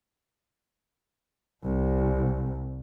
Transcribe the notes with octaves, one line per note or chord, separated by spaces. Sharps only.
C2